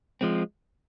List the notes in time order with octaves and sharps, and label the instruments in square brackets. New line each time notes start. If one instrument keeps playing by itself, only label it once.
[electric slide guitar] F3 G#3 C4